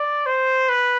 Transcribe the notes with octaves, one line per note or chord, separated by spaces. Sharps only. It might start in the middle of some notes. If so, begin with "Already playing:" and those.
Already playing: D5
C5
B4